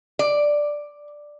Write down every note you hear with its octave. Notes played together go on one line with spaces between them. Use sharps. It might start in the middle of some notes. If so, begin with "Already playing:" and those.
D5